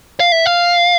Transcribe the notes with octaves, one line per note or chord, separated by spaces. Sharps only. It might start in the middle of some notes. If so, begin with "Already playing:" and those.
F5
E5
F5